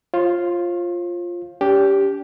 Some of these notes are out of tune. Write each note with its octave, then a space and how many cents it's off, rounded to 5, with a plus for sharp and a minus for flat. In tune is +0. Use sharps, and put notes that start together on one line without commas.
F4 +0 C5 +45
D4 -45 G4 +0